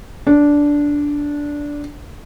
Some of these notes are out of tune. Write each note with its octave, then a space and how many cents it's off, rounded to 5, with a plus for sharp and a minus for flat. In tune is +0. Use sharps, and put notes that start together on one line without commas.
D4 -10